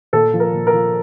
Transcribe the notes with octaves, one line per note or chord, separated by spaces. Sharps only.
A#2 A4
F3
A#4
A#2
A#4
F3